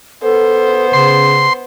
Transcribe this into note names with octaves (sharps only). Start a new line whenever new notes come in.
B3 A4 C5
C#3 C6